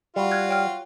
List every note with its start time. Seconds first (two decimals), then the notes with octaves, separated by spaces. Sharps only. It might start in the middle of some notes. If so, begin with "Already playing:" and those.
0.16 G3 F4 F#4
0.31 F6 F#6 G#6
0.49 C#5 G5 F6